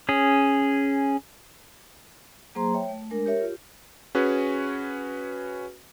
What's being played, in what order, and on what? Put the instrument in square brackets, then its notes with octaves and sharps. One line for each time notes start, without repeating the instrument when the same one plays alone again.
[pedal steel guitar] C#4 G#4
[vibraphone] F#3 A#3 G#4 C5 A#5 C6
C#5 E5 G5
A3
G#3 D4 A#4
G4 A#4 C#5 E5
F4 G4
[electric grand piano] C#4 F#4 G#4 B4